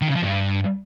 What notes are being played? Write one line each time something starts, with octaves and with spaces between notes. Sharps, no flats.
D#3
C#3
F3
G2